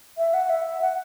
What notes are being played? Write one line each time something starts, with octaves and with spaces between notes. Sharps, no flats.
E5
F#5
E5
F#5